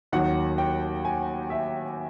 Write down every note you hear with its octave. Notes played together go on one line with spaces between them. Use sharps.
D#2 D#3 F#3 F#5
G5
G#5
E5